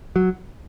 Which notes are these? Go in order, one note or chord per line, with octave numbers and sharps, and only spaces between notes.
F#3